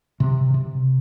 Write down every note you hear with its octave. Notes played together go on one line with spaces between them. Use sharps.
C3
C3